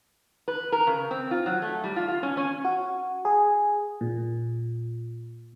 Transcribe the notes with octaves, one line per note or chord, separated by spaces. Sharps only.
B4
A#4
C#3
C4
F4
F#3
A3
G3
F4
F4
C#4
C#4
F#4
G#4
A#2